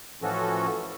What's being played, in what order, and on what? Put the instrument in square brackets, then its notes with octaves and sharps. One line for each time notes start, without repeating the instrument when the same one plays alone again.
[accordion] A2 E3 F3 C#4 F#4 A4